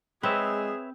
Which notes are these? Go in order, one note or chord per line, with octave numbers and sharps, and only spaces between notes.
G#3 C4 G#4 B4 C#5 E5